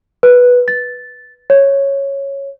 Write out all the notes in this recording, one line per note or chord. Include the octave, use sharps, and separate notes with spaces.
B4
A6
C#5